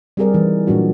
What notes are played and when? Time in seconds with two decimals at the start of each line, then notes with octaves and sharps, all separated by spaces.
0.17 G3 C4 G4 G#4 A#4 D5
0.33 E3 D#4
0.67 A#2 F#3 D4 F#4